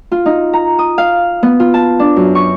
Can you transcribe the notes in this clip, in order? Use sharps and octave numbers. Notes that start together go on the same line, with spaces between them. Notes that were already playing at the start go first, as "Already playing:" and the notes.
F4
D#4
A#5
D#6
F5
B3
F4
A5
D4
F#2
C#6